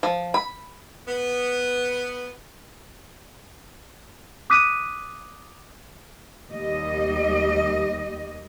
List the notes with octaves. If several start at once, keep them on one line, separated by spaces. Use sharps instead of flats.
F3
B5
B3
D6 D#6 F#6 B6 D#7
D#2 G3 D#5